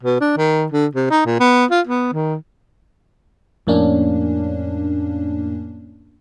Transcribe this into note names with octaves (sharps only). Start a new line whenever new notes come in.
B2
D4
D#3
D3
C3
D#4
A#2
B3
F4
B3
D#3
F2 A2 A#3 C#4 D4